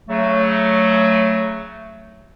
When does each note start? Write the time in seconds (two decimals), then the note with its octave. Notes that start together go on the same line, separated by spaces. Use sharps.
0.09 C#3 F#3 A3